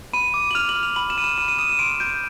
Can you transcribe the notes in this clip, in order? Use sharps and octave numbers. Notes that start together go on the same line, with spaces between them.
B5 D#7
D6
F#7
F6 F7
F#7
F6
F7
B5 F#7
E7
B5 D#7
E7
B5 D#7
D#7
D#6 E7
E7
C6 D7
G6 D7